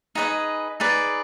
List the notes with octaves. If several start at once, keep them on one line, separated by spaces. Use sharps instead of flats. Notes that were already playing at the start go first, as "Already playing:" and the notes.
D#4 G#4 B4 D#5
D#4 G#4 B4 D5